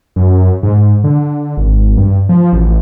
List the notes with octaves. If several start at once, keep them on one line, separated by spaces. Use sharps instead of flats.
F#2
G#2
D3
G#1
G2
F3
A1